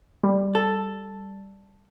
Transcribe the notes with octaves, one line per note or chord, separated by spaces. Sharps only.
G3
A4